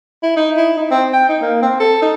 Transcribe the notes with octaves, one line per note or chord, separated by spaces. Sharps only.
E4
D#4
E4
D#4
C4
G5
D#4
A#3
C4
A4
D#4